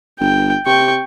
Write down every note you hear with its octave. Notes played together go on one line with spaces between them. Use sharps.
G1 G5
C3 G5 C#6